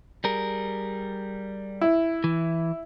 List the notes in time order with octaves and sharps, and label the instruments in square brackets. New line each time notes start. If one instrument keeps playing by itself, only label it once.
[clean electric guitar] G3 G#4 A#4
[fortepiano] E4
[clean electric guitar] E3